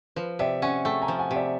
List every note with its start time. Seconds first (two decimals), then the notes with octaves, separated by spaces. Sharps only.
0.16 F3 B4
0.39 C3 D5 E5
0.62 C#4 F#5 G#5
0.85 A3 G5 A5
1.02 G#5 A#5
1.08 F3
1.19 F#5 G#5
1.31 C3
1.36 D5 E5